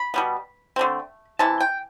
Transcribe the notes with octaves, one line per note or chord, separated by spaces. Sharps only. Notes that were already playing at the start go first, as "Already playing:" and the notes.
Already playing: B5
B2 G3 B3
D3 A3 C4
C3 E3 A5
G5